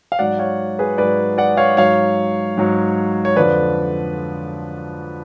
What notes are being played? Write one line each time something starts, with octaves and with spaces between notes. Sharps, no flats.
F5
G#2 F#3 D5 F#5
C#5 F5
G#4 B4
G#2 F#3 B4 D5
D5 F#5
C#5 F5
G#2 F#3 C#5 F5
G#2 F#3
C#5
F2 D3 F3 B4 D5